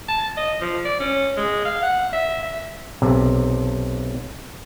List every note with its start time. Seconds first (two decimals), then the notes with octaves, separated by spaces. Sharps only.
0.08 A5
0.37 D#5
0.61 F3
0.85 D5
1.00 C#4
1.37 G#3
1.65 F5
1.83 F#5
2.13 E5
2.43 E5
3.02 B1 C3